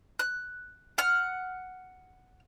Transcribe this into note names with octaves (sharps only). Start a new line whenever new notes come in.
F#6
F#5 F6